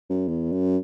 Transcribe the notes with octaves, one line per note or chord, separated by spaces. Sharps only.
F#2
E2
F#2